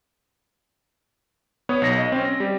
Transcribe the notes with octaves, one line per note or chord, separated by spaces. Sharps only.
B3 C#5 D#6
B1 A#6
D#5
C4 C#4
A#6
G3